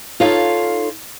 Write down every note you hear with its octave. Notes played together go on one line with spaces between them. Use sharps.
D#4 F4 A4 C#5 F5